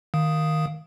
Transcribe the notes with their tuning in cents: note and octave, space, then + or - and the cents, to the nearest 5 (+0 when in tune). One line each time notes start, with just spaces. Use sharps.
D#3 +0 F5 +0 D#6 +0